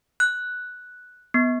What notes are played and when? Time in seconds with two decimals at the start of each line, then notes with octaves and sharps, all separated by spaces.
0.20 F#6
1.34 B3